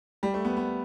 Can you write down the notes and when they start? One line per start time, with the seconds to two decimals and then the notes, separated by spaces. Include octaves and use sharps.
0.23 G3
0.34 A3
0.45 B3
0.57 B3